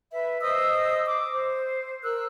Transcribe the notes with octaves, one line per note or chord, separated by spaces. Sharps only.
B4 E5
C5 D#5 D#6 E6
D6 D#6
C5
A#4 E6 F#6